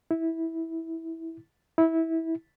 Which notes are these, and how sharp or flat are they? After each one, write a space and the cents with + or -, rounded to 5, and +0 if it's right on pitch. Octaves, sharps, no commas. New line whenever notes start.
E4 -15
E4 -20